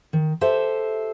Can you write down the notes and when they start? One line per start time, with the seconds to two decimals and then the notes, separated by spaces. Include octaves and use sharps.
0.13 D#3
0.41 G4 A4 C5 E5